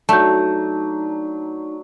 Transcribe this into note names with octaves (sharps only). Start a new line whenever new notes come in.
F#3 A3 D4 D#4 A5 G6